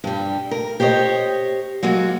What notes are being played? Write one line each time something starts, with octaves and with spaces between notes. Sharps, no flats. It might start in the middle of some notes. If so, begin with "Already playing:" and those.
G2 G3
A#4
G4 C5 C#5 D#5
F#3 G#3 A#3 F#4